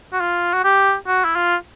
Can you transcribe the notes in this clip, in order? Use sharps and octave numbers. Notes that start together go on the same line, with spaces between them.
F#4
F4
F#4
G4
F#4
E4
F4